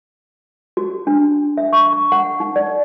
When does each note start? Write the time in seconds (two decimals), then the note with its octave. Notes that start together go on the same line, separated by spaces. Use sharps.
0.77 F#4
1.07 D4
1.58 E5
1.73 C#6
1.93 C#6
2.12 F#5
2.40 D#4
2.56 D5